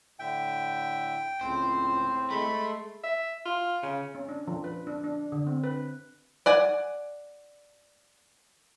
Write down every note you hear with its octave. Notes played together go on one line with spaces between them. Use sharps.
A2 D3 E5 G5
C#2 A2 C4 C5
G#3 A3 B5
C6
E5
F4
C#3
C#4
D4
F3
B4
D4
D4
D3
C4
B4
D5 F#5 G#5